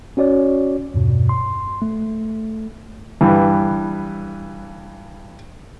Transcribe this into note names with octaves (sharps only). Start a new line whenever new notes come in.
C#4 F#4 C#5 D5
E2 G2 B2
C6
A3
G2 E3